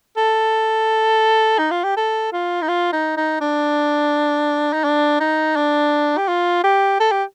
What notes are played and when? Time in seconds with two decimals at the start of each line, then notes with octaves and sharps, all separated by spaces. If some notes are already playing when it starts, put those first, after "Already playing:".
0.17 A4
1.58 D#4
1.71 F4
1.84 G4
1.97 A4
2.33 F4
2.62 D#4
2.68 F4
2.92 D#4
3.17 D#4
3.41 D4
4.73 D#4
4.84 D4
5.20 D#4
5.56 D4
6.17 G4
6.28 F4
6.64 G4
7.00 A4
7.12 G4